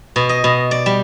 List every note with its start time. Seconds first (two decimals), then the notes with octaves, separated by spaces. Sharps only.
0.16 B2
0.29 D#5
0.44 B2
0.71 D5
0.86 G3